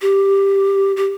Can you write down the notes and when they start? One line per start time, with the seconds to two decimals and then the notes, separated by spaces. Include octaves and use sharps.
0.02 G4
0.97 G4